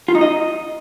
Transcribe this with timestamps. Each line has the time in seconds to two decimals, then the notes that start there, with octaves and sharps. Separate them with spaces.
0.08 F4
0.15 D#4
0.21 D#5